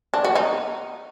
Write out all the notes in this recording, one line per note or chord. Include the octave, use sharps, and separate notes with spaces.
D4
F#4
D#4